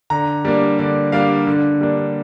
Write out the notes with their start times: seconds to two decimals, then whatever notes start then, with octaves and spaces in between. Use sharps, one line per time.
0.10 D3 A#5
0.45 G3 A#3 D4
0.79 D3 D5
1.12 G3 A#3 D4 F5
1.47 D3
1.81 G3 A#3 D4